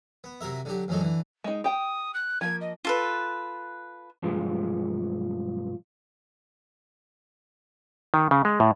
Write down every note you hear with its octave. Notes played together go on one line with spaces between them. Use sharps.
B3
C3 F#3 A#4 E5
D3 F#3 G4
A1 F#2 F3 F#3 G#3 A4
D3 E3
G#3 D#4
G4 G5 D#6
F#6
F3 A#3 G#6
D#5
F4 A4 B4
B1 G2 F3 G#3
D#3
C#3
G#3
A2